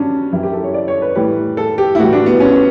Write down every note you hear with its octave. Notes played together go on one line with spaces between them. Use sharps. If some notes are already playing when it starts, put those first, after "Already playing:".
Already playing: G2 F#3 C#4 D4
F#2 E3 G3 E4
G4
A4
C#5
D5
C#5
B4
A2 E3 G3 B4
A4
G4
E4
A2 E3 G3 F#4
D4
B3
C#4